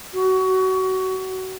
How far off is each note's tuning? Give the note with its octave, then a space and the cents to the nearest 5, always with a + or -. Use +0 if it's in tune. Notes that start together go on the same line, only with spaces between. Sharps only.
F#4 +25